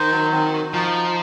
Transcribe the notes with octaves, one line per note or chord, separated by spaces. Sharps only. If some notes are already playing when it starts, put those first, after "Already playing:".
Already playing: D#3 C5
F#3
C4
F#4
F3 D#4